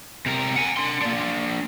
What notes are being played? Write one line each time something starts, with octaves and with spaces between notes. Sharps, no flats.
C3 A#4
F#5 G#5
D4 C6
A#3 D4